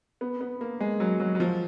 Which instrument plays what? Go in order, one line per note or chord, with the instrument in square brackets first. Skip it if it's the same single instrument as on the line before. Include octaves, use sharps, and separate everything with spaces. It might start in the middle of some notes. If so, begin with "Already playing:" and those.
[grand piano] B3
B3
A#3
G#3
F#3
F#3
F#3
F3